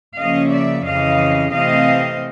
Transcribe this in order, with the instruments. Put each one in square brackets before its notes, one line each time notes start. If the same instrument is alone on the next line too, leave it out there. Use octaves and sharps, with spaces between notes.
[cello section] C#3 F3 A#3 C#4 D#5 F5
D5 E5
F2 C#3 E3 D#5 F5
C3 E3 A3 C4 D#5 F5